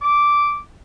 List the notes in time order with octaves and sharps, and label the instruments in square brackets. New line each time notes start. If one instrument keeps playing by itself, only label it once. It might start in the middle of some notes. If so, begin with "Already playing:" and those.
[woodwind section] D6